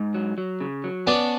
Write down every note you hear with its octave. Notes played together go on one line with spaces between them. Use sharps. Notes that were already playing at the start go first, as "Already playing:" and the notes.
Already playing: G#2
F#3
F#3
C#3
F#3
B3 C#4 D4